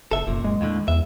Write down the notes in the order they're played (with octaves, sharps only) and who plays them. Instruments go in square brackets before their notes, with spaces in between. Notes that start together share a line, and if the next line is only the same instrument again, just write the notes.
[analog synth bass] F#1 [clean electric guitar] A4 E5
[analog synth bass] F1 [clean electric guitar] F#2 A#2
[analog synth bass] G#3
[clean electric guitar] D#2 A2 D3
[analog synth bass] E2 [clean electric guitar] E5